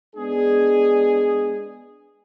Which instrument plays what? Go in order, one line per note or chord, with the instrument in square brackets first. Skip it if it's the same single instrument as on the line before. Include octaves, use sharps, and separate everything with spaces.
[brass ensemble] G#3 B3 D4 G#4